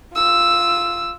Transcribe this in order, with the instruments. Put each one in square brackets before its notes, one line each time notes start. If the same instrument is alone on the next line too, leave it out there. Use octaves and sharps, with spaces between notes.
[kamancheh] F4 E6